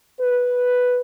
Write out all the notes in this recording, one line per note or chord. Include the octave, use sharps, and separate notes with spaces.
B4